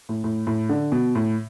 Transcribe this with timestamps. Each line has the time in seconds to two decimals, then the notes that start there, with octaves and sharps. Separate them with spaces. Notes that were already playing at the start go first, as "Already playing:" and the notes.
0.09 A2
0.24 A2
0.47 A2
0.69 D3
0.92 B2
1.15 A2